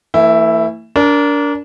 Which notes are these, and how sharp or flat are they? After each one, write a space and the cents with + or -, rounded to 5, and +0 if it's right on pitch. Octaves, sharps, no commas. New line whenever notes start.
E3 +0 A3 +40 E4 +0
D4 -25 A#4 +5